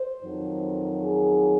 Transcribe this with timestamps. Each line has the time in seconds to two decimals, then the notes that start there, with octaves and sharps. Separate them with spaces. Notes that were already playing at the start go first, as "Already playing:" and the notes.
Already playing: C5
0.22 F2 D#3 F#3
1.02 G#4